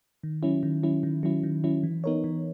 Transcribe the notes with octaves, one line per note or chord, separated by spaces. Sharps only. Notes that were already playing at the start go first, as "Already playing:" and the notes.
D#3
F#3 C#4 E4
D#3
F#3 C#4 E4
D#3
F#3 C#4 E4
D#3
F#3 C#4 E4
E3
B3 D#4 A#4 C#5
E3